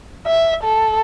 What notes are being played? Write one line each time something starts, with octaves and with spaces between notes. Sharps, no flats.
E5
A4